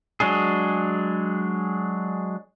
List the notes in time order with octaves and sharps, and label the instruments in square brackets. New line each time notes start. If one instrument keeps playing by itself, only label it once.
[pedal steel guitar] F#3 G#3 D4 G#4